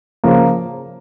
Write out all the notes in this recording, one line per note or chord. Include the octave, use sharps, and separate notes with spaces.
C#3 F3 A#3